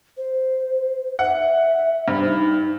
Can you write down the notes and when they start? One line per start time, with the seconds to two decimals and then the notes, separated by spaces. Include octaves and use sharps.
0.17 C5
1.19 E5 F#5
2.08 G2 C5
2.24 D#4